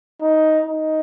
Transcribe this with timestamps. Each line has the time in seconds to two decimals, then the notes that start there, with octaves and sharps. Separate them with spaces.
0.22 D#4
0.66 D#4